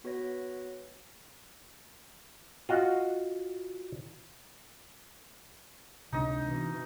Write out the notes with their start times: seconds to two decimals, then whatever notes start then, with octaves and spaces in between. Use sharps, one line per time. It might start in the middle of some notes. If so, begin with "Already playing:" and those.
0.04 B3 F#4 B4 C#5 A#6
2.69 F4 F#4 D#5
6.13 C#2 C3 D4 D#4 D#5
6.45 B2 E3